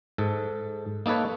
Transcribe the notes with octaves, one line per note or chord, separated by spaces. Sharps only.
G#2 A4
A#3 D#4 A4 B4 C#5